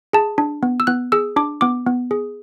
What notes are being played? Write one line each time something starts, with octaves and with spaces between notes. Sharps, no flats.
G#4 A5
D4
B3
E6
B3 F#6
G#4 E6
D4 D6
B3 D6
B3
G#4